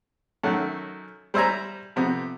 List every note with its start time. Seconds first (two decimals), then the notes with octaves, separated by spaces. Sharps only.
0.43 F#2 D#3 F#3 A3 F#5
1.34 G3 C5 E5 G#5 A#5
1.96 F2 C3 B3